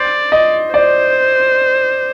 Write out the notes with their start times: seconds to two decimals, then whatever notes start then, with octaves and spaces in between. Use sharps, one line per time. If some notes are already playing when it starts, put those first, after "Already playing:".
Already playing: C5 D5
0.32 D#5
0.73 C5 D5